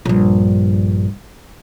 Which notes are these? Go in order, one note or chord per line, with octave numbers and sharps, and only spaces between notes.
A#1 G2